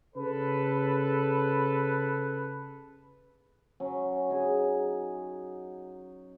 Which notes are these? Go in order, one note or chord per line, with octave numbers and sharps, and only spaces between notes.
C#3 A4 B4
F#3 C#4
F#3 D#4 G#4